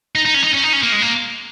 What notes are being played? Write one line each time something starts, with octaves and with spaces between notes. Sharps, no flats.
D#4
D#4
C#4
D#4
C#4
D#4
C#4
A#3
G#3
A#3